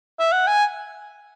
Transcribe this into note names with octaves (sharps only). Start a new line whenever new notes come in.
E5
F#5
G#5